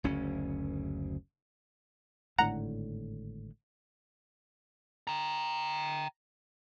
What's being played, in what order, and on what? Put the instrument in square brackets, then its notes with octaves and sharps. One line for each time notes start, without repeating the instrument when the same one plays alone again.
[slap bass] F#1 D2 C#4
[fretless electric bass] G#1 A2 D3 [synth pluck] F#5 A#5
[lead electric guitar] G5 A#5